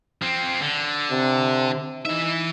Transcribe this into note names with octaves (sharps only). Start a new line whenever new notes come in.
F3 C4
D3
C3
E3 D#4 E5